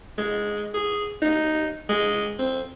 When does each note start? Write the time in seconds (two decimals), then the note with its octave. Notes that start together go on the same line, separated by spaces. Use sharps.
0.18 G#3
0.74 G#4
1.22 D#4
1.89 G#3
2.39 C4